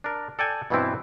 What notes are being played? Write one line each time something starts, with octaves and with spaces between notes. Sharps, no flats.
D4 A#4
A4 D5 G5 G#5
G2 B2 E3 B3 C4 E4